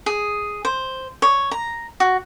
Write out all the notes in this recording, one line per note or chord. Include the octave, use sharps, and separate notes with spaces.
G#4
C5
C#5
A#5
F#4